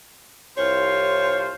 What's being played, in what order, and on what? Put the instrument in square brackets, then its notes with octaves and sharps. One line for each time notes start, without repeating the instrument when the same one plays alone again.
[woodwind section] C2 F4 C5 [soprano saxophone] C#5